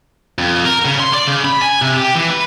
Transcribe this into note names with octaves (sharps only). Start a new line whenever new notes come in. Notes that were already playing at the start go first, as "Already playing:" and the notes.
F2
A#4
C#3
C6
D5
C#3
B5
G#5
C3
G4
E3
B4